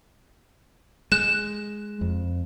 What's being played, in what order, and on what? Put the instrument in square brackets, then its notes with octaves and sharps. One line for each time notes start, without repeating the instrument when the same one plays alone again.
[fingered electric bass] G#3 [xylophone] F#6 E7
[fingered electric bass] F2